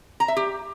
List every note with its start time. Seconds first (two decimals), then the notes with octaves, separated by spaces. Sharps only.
0.20 A#5
0.28 E5
0.37 G4